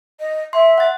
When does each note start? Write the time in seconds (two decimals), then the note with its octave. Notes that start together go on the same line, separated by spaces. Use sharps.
0.19 D#5
0.53 E5 C6
0.78 F#5 A6